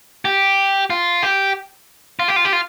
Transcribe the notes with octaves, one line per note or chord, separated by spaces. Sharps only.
G4
F4
G4
F4
G4
F4
G4
F4